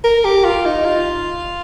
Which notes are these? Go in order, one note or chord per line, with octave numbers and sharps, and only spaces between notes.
A#4
G4
F4
D#4
F4